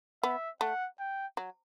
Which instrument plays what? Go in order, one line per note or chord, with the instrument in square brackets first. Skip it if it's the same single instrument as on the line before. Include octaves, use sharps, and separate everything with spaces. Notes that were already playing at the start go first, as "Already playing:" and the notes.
[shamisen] B3 [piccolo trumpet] E5
[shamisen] A3 [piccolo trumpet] F#5
[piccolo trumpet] G5
[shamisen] F#3